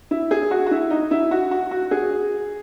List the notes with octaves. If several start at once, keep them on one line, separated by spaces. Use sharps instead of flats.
E4
G#4
F#4
F#4
E4
D#4
E4
F#4
F#4
F#4
G#4